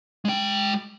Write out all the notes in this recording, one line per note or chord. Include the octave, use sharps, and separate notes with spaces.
G#3 G5